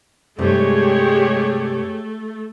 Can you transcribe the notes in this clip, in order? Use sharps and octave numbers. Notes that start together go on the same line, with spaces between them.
G2 C3 G#3 A3 D#4 G4 C#5